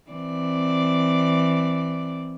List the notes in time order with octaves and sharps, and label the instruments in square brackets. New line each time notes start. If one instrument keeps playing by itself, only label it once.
[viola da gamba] E3 C4 D5